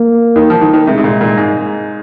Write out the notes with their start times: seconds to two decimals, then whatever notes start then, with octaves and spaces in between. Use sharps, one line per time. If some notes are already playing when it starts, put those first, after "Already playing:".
Already playing: A#3
0.36 D#3
0.50 F3
0.61 D#3
0.73 D#3
0.87 C3 G#3
0.98 C3
1.04 A#2
1.21 A#2
1.38 G#2